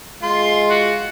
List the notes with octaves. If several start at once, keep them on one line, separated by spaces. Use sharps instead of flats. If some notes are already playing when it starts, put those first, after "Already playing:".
G#3 F4 C6
F#4